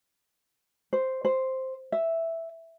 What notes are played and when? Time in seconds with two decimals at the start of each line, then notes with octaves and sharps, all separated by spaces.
0.93 C5
1.25 C5
1.92 E5